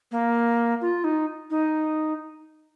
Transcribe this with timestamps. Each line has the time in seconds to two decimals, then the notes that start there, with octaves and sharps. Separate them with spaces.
0.12 A#3
0.81 F4
1.04 D#4
1.50 D#4